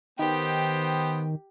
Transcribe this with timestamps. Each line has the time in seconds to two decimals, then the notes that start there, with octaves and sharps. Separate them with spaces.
0.19 D#3 B3 G4 C5 G5